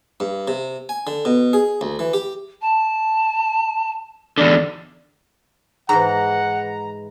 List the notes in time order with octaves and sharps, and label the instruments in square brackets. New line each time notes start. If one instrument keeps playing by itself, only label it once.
[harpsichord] G2
C3
G#5
D3
B2
G#4
D2
E3
G4
[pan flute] A5
[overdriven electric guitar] E2 D3 [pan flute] D5
[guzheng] G#2 E3 [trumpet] F#5 [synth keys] A#5